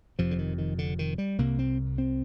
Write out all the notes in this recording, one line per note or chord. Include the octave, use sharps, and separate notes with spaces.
F1 F2 C3 F3
D3
D#3
D#3
D3
D#3
G3
C2 C3 A#3
C4
C4